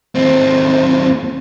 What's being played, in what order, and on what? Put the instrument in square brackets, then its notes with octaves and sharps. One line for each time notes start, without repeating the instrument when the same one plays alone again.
[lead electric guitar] D#2 C4